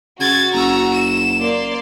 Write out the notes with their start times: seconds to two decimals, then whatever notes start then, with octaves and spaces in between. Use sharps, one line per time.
0.20 C#3 F#4 G#6 A6
0.53 F#1 A#5 E6
0.94 E7
1.39 A#3 D5 C6